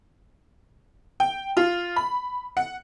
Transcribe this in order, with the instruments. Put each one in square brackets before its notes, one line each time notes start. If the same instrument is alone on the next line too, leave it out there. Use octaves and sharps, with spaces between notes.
[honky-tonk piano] G5
F4
B5
F#5